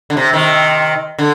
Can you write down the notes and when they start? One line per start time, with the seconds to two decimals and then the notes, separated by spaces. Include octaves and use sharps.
0.10 D3
0.17 C3
0.33 C3 D#3
1.18 D3